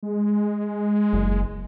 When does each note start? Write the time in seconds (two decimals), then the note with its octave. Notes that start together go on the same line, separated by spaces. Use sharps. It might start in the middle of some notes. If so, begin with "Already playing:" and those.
0.03 G#3
1.13 F#1